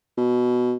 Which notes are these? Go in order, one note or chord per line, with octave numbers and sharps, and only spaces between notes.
B2